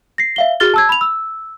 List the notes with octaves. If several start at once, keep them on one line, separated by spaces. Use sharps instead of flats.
A#6 C7
E5 F5 G7
F#4 G#4 F6 A6 G7
A5 E6 G#6
B5 F7
E6